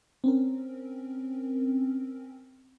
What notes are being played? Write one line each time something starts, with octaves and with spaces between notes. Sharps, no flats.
C4 C#4 A#4